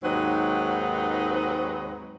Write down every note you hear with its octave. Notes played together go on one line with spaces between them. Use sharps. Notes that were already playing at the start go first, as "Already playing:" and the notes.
D#2 G#2 F#3 C4 D#4 B4